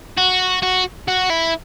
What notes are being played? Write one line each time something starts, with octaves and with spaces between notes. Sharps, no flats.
F#4
F#4
F#4
E4